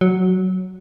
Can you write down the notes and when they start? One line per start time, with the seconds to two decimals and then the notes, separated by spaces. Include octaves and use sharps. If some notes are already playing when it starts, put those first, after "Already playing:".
0.01 F#3